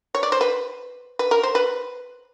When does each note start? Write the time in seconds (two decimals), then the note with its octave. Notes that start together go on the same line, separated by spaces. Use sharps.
0.15 C#5
0.23 D5
0.32 C5
0.41 B4
1.19 B4
1.31 A#4
1.43 C5
1.55 B4